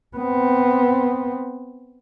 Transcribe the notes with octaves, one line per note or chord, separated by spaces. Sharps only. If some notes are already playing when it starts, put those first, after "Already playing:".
B3 C4